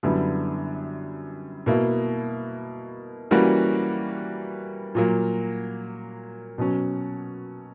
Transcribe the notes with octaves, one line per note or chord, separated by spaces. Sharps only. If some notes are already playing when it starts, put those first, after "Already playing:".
F#2 D3 G3 B3 E4
B2 A#3 E4
E3 G3 A#3 C#4 F#4
A#2 F#3 A#3
B2 F#3 C#4